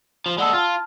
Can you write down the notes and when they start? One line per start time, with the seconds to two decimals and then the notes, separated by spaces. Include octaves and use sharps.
0.26 F3
0.38 G#3 A4 D5 F#5 E6
0.53 F4 A5 F6